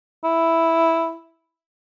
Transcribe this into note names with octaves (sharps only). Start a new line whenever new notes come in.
E4